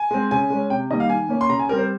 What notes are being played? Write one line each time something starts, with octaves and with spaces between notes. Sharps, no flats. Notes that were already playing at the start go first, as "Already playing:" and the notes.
Already playing: G#5
G#3 C4
C#3 G#5
G#3 C#4
C3 G5
D#3 G3 A#3 D#5
F5
D#3 G#5
A#3 C#4
C6
C#3 A#5
G#5
G3 C4 A#4
C5